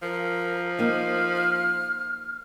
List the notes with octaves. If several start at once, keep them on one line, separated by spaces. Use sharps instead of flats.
F3 A#4
A#3 D#4 F6